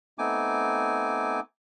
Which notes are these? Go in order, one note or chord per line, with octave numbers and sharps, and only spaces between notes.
A3 B3 C4 D#4 G#5 D6